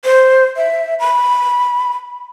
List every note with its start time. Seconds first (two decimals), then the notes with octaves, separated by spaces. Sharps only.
0.05 C5
0.57 E5
1.00 B5